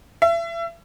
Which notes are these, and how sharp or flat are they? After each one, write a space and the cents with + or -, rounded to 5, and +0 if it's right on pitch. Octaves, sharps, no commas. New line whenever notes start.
E5 +35